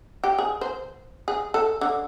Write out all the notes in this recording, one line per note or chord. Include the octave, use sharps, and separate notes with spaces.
G4
G#4
C5
G#4
A4
D3